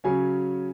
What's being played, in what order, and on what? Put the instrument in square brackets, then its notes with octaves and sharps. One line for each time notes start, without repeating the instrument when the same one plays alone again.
[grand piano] C#3 F#3 C#4 G#5